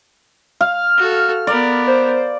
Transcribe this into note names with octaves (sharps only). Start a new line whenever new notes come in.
F5 F6
F#4 A4
B3 A#4 D5
C5